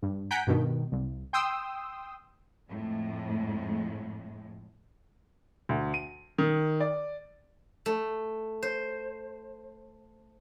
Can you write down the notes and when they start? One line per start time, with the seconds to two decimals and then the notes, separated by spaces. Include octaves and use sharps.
0.02 G2
0.31 F#5 G#5 A#5 G6 B6 D7
0.47 G2 B2 D#3
0.92 C2
1.33 G5 C6 D#6 E6
2.69 F2 A2 G#3
5.69 D2
5.94 D#7
6.38 D#3
6.81 D5
7.86 A3
8.63 C5